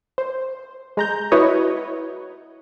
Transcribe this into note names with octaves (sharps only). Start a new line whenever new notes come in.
C5
G#3 A#5 G6
E4 F#4 B4 C#5 D#5